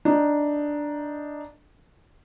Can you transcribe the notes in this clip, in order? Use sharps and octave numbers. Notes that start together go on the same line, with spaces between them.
D4 D#4